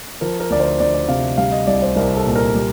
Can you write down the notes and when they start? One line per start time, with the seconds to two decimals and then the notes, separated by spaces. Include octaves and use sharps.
0.21 F3 A#4
0.40 A#4
0.50 D2 D5
0.60 C5
0.80 D2 D5
0.94 D5
1.08 C3 F5
1.38 G3 F5
1.52 D#5
1.67 C2 D5
1.82 C5
1.96 C2 A#4
2.17 A4
2.26 A#2
2.36 A#4
2.55 G3